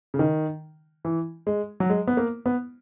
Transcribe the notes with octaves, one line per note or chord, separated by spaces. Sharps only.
C#3
D#3
E3
G#3
F#3
G#3
B3
A#3
B3